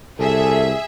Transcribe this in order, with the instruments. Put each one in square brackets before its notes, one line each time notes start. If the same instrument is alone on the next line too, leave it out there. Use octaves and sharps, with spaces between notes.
[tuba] C2 [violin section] G#4 E5 [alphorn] A4